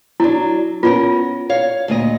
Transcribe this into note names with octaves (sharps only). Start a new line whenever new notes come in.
F#3 D4 E4
B3 C#4 F4 A#4
C#5 F5
D2 A#2 D#5